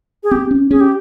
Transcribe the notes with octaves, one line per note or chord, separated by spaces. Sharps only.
G#4
C4 G4
C#4
C#4 G#4
G4